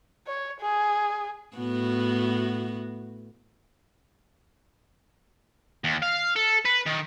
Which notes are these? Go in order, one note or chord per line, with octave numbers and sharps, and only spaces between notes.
C#5
G#4
A2 B3 F#4
D#2
F5
A4
B4
D#3